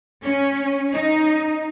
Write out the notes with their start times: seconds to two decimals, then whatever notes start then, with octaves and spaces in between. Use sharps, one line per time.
0.24 C#4
0.95 D#4